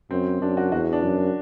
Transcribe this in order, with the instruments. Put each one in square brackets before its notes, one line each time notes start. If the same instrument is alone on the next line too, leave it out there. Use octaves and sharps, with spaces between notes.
[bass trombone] F#2 [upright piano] C4
[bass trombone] F#2 [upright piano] D4
[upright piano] F#4
[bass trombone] E2 [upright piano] F#4
[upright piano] D4
[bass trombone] F#2